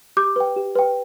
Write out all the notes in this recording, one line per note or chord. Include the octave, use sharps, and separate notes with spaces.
G4 D6 G6
B4 G5
G4
B4 G5